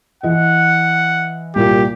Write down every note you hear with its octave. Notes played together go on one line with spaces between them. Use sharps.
E3 D#5 F#5
C2 A#2 G4